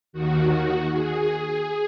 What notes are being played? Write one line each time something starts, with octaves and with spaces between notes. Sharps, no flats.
D#2 D#3 F#4
G#4